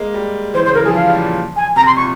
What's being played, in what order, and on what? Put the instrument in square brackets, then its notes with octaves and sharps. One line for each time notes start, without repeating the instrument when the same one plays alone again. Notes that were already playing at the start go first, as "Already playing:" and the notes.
Already playing: [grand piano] G#3 A#3
G3
[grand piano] E3 [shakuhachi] C5
[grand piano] C#3 [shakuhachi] C5
[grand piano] E3 [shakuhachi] A#4
[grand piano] F3 [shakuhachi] G#4
[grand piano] F3 [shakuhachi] F5
[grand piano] G3
A#2
[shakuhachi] G#5
[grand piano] C3 [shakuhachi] A#5
[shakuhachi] C6
[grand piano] A#2 [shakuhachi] C#6